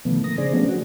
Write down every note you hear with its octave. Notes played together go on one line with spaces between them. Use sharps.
B2 D3 D#3 F3 A3 B3
A#3 D#6 A#6
C#3 D4 G#4 C5 D5
F3 F#3 A3 B3 C#4 D4
F#4